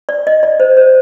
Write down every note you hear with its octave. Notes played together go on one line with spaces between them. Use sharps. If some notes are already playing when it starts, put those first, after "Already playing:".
D5
D#5
D5
C5
C5